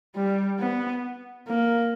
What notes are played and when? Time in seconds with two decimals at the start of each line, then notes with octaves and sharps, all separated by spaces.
0.16 G3
0.60 B3
1.48 A#3